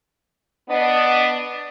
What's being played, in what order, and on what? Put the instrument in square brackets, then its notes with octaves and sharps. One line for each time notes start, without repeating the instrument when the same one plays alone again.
[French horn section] B3 D4 D#5